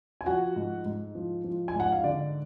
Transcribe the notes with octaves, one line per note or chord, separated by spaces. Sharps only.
G#5
F3 F#4 F#5
G#2
G#2
F3
F3
G#5
G#2
F#5
F5
D3 D5